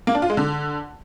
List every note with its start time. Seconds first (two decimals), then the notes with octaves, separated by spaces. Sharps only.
0.07 A#3
0.15 D4
0.22 F4
0.30 G#3
0.37 D3